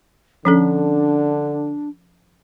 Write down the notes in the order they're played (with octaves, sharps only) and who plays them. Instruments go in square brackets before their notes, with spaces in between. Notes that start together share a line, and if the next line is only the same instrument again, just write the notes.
[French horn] D3 [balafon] F3 C#4 A4 [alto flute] D4